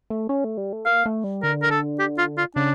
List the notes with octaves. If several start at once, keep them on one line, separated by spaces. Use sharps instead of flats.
A3
C#4
A3
G3
A3
A#3 F5
A3
G3
D3 A#4
A#4
A4
G4
F4
F4
C#3 D4